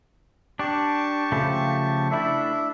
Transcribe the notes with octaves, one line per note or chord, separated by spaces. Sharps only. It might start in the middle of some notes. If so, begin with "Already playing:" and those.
D4 G4 A5 C#6
C#3 F3 A3
A3 D4 E4 E5